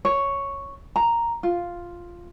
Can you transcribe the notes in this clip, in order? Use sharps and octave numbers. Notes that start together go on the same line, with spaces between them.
C#5
A#5
F4